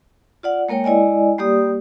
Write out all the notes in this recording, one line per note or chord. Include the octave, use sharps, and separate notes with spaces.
F4 D5 F#5
G#3 A#3 A#4 C#5 G5
G#3 E4 D5 D#5 G#5
G3 A#3 G4 D5 D#6